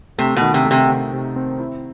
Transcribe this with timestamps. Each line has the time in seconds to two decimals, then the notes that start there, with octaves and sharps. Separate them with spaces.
0.18 C3 A3
0.36 B2
0.42 D#3
0.54 C3
0.65 A3
0.71 C3
0.89 C3
1.13 C3
1.36 C4
1.60 E4